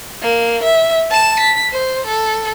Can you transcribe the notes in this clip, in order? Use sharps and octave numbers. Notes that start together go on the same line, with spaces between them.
A#3
E5
A5 E7
B6
C5
A4